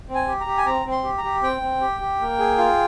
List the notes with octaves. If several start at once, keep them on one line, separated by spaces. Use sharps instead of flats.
C4
G#5
G4
A#5
G4
G#5
C4 A#5
C4
C6
G4
A#5
G4
C4 G5
C4
G4
G4
A#3
G#4
F4